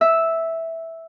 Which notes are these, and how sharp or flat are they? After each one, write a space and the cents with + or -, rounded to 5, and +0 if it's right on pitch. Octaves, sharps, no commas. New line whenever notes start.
E5 -5